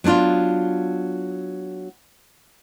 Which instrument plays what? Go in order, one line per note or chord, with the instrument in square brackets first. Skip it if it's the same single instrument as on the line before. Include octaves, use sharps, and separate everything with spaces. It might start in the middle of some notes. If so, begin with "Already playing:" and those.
[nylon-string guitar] F#3 B3 D4 F4